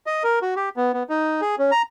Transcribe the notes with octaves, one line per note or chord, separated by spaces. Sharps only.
D#5
A#4
F#4
G4
B3
B3
D#4
G#4
C#4
A#5